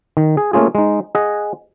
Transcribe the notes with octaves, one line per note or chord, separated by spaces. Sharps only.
D#3
G#4
A3 A#3 C#4 F4 G#4
G#3 D#4
G#4 D#5 F#5